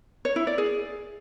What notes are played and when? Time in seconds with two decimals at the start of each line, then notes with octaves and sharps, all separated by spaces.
0.25 C#5
0.36 E4
0.47 D5
0.58 G#4